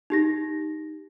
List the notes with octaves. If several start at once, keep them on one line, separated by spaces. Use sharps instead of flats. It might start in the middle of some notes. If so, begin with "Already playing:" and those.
D#4 G4 A#6